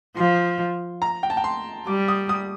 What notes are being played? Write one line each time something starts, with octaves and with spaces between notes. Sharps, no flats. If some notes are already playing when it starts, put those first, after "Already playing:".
F3 C6
A#5
G5
A5
G5
C6
G3 D6
D#6
D#6